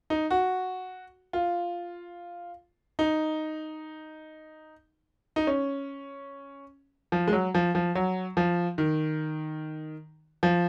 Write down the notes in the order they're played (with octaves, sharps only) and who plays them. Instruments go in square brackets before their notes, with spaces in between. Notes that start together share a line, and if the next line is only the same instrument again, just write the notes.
[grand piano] D#4
F#4
F4
D#4
D#4
C#4
F3
G#3
F#3
F3
F3
F#3
F3
D#3
F3